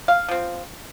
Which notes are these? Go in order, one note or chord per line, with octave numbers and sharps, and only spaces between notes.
F5
F3 C4